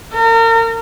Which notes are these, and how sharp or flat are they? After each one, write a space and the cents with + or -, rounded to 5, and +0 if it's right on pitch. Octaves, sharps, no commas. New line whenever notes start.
A#4 -35